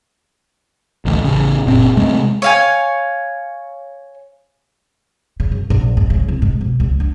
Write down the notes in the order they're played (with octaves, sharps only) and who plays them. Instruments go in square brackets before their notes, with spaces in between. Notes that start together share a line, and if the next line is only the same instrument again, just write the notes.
[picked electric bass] A1 D2
A1 C#3
F#1 A#2 C4
C3 G#3 A3 C4
[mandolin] C#5 F5 G#5
[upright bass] C#3
F#2
A#1
G#2
C#3
C2
G#2
B2
C#2
D4